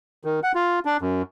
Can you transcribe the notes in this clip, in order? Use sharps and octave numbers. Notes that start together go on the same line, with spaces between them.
D#3
F#5
F4
D4
F#2